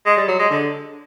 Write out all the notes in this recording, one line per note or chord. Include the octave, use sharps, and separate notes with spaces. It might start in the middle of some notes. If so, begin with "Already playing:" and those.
G#3
G3
F#3
G#3
D3